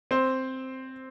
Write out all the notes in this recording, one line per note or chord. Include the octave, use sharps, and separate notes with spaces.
C4 C5